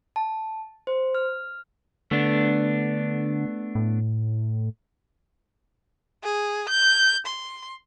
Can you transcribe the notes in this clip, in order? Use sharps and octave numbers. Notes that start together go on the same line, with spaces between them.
A5
C5
F6
D3 A3 B3 D4
A2
G#4
G6
C6